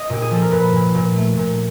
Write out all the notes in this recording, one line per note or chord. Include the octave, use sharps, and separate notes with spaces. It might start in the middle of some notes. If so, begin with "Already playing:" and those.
Already playing: D#5
A#2 G4
G#4
F3 A4
A#4
A#2 B4
A#2
A#2
A3
A#2